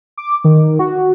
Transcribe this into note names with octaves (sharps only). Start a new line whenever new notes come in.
D6
D#3
F#4